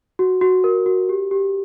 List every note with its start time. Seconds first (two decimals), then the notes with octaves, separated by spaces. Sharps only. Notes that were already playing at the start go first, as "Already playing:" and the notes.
0.19 F#4
0.41 F#4
0.64 A#4
0.86 F#4
1.09 G4
1.31 G4